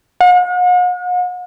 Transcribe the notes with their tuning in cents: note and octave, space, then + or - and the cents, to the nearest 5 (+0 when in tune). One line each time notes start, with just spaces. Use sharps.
F#5 -45